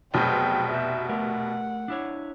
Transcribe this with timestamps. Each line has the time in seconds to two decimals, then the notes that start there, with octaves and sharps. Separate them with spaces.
0.14 F1 B2 F#3 G#4 C5 G5
0.71 F#4 G4 E5
1.09 A3 G4 A#4 F#5
1.88 D4 E4 C#5